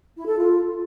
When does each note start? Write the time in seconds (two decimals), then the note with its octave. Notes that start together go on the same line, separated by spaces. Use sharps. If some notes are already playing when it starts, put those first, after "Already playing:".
0.16 E4
0.27 A4
0.37 F4